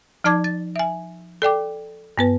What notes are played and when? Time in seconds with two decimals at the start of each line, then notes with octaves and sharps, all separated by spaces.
0.24 F3 D#4 D5 A5 D6 G#6
0.44 A6
0.76 E5 G#5
1.42 A4 D5 G5 D6
2.17 G2 B3 B4